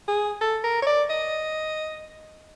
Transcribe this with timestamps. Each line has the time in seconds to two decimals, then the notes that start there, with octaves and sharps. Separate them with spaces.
0.08 G#4
0.41 A4
0.64 A#4
0.82 C#5
0.87 D5
1.10 D#5